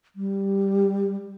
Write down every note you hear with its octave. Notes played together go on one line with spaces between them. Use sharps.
G3